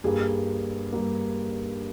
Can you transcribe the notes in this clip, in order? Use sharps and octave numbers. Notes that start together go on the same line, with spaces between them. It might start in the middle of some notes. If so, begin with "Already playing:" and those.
G2 G3 A#3 G#4
G2 G3 A#3